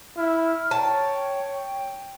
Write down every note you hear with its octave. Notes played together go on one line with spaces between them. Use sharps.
E4 F6
C#5 G5 A5